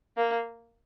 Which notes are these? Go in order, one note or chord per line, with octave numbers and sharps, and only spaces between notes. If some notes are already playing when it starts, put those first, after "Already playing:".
A#3